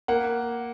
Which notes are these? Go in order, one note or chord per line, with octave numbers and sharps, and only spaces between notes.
A#3 F#5